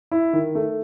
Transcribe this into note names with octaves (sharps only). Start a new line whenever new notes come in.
E4
D#3
A3